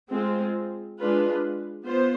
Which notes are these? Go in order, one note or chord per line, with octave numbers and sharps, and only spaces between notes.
G#3 C4 F4
G#3 D4 F4 B4
B3 F4 C5